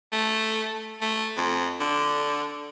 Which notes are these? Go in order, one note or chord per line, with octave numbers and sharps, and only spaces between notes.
A3
A3
F2
D3